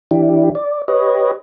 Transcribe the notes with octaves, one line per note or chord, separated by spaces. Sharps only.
E3 D4 E4 G4
D5
G4 B4 C#5 D#5